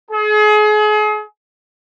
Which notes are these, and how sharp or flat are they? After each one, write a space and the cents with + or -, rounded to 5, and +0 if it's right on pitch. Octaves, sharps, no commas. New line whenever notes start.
G#4 +35